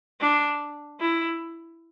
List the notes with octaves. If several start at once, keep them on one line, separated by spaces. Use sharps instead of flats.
D4
E4